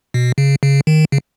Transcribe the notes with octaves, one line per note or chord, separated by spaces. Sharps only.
B2
C#3
C#3
D#3
C#3